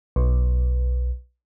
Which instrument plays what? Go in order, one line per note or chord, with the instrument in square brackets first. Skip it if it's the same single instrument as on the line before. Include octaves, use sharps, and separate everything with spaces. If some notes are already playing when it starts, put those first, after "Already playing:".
[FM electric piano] B1